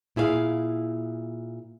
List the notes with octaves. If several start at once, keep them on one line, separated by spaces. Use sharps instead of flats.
A#2 E4 G#4 C5 F5